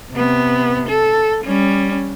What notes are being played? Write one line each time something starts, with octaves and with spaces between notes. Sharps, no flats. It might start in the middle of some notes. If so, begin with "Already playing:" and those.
C3 B3
A4
G3 C#4